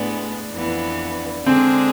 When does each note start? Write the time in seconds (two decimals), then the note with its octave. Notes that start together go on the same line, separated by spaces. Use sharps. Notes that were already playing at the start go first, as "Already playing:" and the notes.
Already playing: A2 G#3 B3 D4
0.53 F2 E3 B3
1.46 D3 G#3 C4 D4 G#4